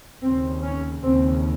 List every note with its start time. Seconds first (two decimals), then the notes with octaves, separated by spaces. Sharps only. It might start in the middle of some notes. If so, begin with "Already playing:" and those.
0.22 D#2 C#3 C4
0.62 C#4
1.03 D#2 C#3 C4